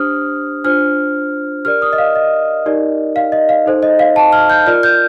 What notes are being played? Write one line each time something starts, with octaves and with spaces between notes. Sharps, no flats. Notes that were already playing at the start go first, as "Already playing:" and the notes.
Already playing: D4 G4 C5 D#6 F6
D4 F4 C5 F6
G4 A#4 D5 F6
D#6
D#5
F5
D#5
D#4 G4 A#4 D5
F5
D#5
F5
D#4 A4 C5
D#5
F5
A5
F6
G6
F4 A#4 D5 F6
G6